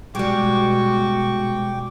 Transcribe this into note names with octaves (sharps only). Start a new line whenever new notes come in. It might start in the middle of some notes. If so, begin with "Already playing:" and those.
B2 G3 G#3 F#4 G5 C#6 D6